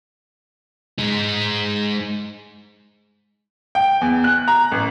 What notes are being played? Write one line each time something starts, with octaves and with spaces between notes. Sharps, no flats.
G#3 D#4
G5
E2
F#6
A#5
A1